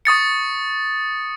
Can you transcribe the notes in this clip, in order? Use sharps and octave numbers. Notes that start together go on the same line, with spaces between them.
C#6 D#6 A6 C#7